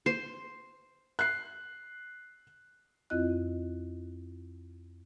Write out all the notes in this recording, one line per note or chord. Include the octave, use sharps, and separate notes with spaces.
C5
F#6 C7
F2 C4 E4 F4 D#5 F#6